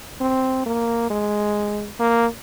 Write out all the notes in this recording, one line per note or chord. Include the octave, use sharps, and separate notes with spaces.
C4
A#3
G#3
A#3